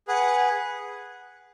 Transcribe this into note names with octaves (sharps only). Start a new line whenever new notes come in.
G#4 B4 F#5